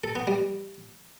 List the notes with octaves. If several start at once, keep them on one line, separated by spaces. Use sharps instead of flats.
A4
B3
G3